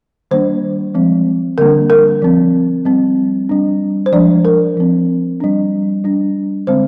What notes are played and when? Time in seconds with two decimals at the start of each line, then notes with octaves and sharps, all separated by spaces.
0.31 D#3 G3 A#3 D4 C5
0.95 F3 G#3 C4
1.58 D3 G3 A#3 D4 A#4
1.90 A#4
2.22 F3 C4
2.85 G3 C4
3.49 G3 D4
4.06 C5
4.12 F3 G#3 D4 D5
4.45 A#4
4.77 F3 C4
5.40 G3 D4
6.04 G3 D4
6.67 D3 G#3 C4 C5